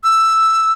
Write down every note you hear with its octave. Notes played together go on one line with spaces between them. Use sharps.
E6